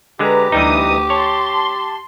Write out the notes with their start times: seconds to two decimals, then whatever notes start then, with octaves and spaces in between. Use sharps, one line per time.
0.19 D3 G#3 G4 B4 A#5
0.52 D2 E3 G3 D#4 D#6
1.10 C#5 A5 C6